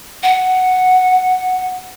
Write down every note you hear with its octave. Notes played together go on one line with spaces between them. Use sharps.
F#5